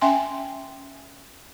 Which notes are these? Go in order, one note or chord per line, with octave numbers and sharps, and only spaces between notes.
C#4 E5 G5 G#5 C6